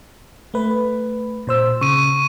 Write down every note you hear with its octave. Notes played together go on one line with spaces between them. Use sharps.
A3 B4
A#2 C5 E6
C#3 C#6 D#7